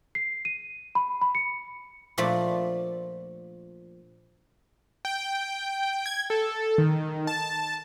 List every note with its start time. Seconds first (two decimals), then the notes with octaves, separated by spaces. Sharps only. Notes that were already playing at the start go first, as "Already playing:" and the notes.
0.15 C7
0.45 D#7
0.95 B5
1.22 B5
1.35 C#7
2.18 A#2 F3 A3 D4 A5 B5
5.05 G5
6.06 G#6
6.30 A4
6.78 D#3
7.27 A5